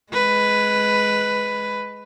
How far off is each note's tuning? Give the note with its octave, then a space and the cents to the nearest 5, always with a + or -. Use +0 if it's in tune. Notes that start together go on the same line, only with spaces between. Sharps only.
G#3 +10 B4 +5